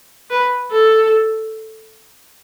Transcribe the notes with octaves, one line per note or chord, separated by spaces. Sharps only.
B4
A4